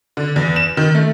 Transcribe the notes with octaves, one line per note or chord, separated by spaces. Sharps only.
D3
E2
E7
D#3
A3